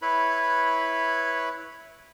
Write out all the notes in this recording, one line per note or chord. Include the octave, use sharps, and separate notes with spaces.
E4 B4 C#5 B5